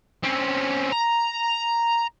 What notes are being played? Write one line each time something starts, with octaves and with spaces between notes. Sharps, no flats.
C4 C#4
A#5